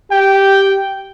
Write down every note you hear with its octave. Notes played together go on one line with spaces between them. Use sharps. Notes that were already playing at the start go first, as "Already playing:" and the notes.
G4 G5